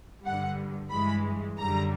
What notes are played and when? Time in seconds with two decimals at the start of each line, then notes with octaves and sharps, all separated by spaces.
0.24 G2 D3 G3 F#5
0.91 G2 E3 G#3 B5
1.58 F#2 D3 G3 A#5